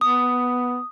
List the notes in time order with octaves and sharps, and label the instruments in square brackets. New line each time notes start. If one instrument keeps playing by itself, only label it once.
[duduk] B3 [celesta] D#6